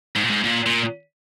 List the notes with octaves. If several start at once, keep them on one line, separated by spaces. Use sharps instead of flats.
G#2
A#2
G#2
A#2
A#2